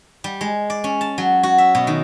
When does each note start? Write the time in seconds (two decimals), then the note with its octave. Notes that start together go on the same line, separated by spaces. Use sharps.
0.24 G3
0.41 G#3
0.70 D5
0.84 C#4
1.01 A5
1.18 F#3
1.43 F#4
1.58 E5
1.75 B2
1.87 D#3